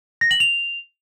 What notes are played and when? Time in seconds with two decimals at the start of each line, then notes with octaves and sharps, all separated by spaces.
0.21 A#6
0.31 F#7
0.40 F7